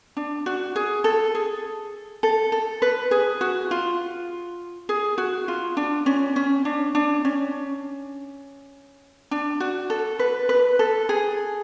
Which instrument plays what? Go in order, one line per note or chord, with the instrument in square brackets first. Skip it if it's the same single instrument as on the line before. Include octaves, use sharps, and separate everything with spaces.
[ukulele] D4
F#4
G#4
A4
G#4
A4
A4
B4
G#4
F#4
F4
G#4
F#4
F4
D4
C#4
C#4
D4
D4
C#4
D4
F#4
A4
B4
B4
A4
G#4